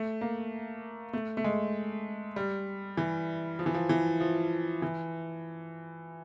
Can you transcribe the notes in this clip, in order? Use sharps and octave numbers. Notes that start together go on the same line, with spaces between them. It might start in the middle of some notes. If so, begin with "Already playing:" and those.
Already playing: A3
A#3
A3
A3
G#3
G3
E3
F3
E3
F3
E3
F3
E3